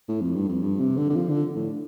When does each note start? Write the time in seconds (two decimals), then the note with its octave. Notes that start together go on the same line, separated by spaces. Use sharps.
0.09 A2
0.21 F2
0.35 G2
0.49 F2
0.62 G2
0.80 C3
0.97 D3
1.10 D3
1.16 F3
1.29 D3
1.56 A2